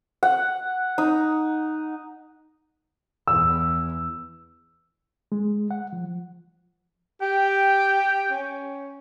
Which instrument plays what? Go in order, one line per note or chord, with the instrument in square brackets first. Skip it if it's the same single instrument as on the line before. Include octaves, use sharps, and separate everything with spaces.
[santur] F#5
D#4
[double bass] E2 [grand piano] E6
[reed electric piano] G#3
F#5
F3
[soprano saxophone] G4 [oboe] G5
[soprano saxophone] C#4